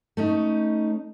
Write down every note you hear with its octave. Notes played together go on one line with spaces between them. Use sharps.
A3 C#4 D#4